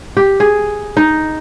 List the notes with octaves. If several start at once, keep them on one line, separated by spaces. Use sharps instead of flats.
G4
G#4
D#4